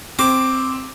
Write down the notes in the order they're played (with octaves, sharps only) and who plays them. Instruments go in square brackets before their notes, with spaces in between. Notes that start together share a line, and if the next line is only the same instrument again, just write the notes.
[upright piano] C4 [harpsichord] D6